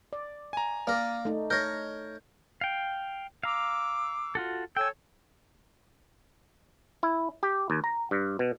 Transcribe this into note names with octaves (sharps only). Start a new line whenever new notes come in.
D5
G#5 A#5
A#3 A#4 D5
A3 D#4
A#4 C#5 G6 A#6
F5 G5
F5 A#5 D6 E6
F4 F#4 A4
A4 C#5 G5 G#5 E6
E4
G4
D#2
A#5
G2
B2